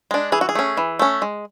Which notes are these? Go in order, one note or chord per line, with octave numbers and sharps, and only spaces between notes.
G#3 D4
E3 G#4
F#4
G#4
A3 C#4
E3
A3 C#4
G#3